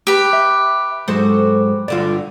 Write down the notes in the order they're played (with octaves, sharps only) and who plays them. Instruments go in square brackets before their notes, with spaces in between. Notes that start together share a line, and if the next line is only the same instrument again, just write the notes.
[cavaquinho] G4 B4
[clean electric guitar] E5
[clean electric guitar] G#2 F#3 G#3 [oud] F#4 A4 C5
[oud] G2 D3 F#4 [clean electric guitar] F4 A4 D5